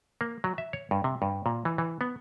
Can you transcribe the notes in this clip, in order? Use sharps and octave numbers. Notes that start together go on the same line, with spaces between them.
A#3
F#3
E5
C#5
G2
C3
G2
A#2
E3
E3
B3